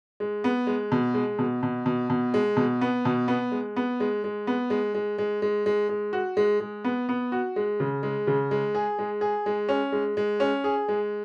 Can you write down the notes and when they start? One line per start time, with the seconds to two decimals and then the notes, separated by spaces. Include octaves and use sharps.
0.20 G#3
0.44 B3
0.67 G#3
0.92 B2
1.14 G#3
1.39 B2
1.63 B2
1.86 B2
2.10 B2
2.34 G#3
2.57 B2
2.81 B3
3.05 B2
3.28 B3
3.52 G#3
3.76 B3
4.00 G#3
4.24 G#3
4.47 B3
4.70 G#3
4.94 G#3
5.18 G#3
5.42 G#3
5.66 G#3
5.89 G#3
6.13 F#4
6.37 G#3
6.60 G#3
6.84 B3
7.09 B3
7.32 F#4
7.56 G#3
7.80 C#3
8.03 G#3
8.27 C#3
8.51 G#3
8.75 G#4
8.99 G#3
9.21 G#4
9.46 G#3
9.69 C#4
9.92 G#3
10.17 G#3
10.40 C#4
10.64 G#4
10.88 G#3